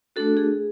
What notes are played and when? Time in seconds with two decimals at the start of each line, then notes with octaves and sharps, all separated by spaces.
0.16 A3 D4 F#4 A4
0.37 G#4